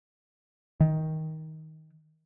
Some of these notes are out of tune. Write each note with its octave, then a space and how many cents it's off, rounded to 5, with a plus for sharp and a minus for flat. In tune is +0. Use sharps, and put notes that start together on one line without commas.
D#3 +15